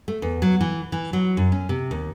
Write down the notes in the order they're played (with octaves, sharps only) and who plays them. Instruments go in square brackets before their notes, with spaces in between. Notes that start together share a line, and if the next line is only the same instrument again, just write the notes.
[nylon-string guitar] A3
E2
F#3
E3
E3
F#3
F#2
C#4
C3
D#2